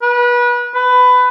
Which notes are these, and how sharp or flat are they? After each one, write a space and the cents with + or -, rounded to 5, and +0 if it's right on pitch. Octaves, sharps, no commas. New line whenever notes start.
B4 -30
B4 +20